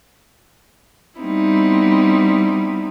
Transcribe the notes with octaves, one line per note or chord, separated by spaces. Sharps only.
G3 B3 C4 D#4 E4